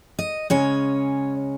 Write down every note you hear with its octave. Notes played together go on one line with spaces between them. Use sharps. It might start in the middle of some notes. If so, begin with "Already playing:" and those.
D#5
C#3 G#3 C#4 C#5